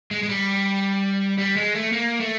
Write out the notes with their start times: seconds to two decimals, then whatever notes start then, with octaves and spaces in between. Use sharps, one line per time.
0.11 G#3
0.23 G#3
0.29 G3
1.38 G3
1.56 G#3
1.75 A3
1.92 A#3
2.20 A3